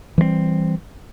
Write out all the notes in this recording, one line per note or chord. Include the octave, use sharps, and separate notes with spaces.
E3 G3 G#3 C4